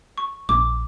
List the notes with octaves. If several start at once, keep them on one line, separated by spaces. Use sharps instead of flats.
C#6
A#1 D6